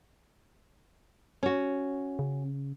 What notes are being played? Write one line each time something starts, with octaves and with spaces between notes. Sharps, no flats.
C#4 F#4
C#3